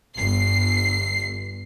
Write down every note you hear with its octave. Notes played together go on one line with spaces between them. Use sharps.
G1 C7